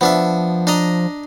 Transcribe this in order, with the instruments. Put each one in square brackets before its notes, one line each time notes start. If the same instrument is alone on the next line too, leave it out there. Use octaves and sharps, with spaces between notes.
[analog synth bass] F3 [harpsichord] B3 D4 E5
[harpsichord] D4 D#5 A#5